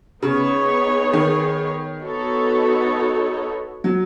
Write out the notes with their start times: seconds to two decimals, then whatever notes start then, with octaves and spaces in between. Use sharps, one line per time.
0.22 C#3 B3 D#4 G#4 C#5
1.13 D#3
2.03 B3 D#4 F#4 A4 C#5
3.84 F#3